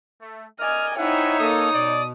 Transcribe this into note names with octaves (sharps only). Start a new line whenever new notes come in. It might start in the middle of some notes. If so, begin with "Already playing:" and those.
A3
A#4 D5 D#5 G#5 F6
C4 D#4 E4 C#5 E5 F#5 G#5
A#3 A4 D#6
B2 D5